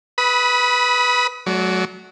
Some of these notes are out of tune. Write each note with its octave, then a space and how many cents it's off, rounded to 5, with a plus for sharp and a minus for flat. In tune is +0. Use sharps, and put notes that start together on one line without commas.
B4 +0 B5 -20 D#6 +25
F#3 +0 A3 -40 D5 -30